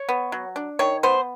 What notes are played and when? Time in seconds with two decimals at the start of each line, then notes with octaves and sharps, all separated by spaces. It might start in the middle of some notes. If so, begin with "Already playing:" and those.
Already playing: C#5
0.09 B3
0.32 F#3
0.56 D4
0.79 D#3 C#5
1.03 B3 C5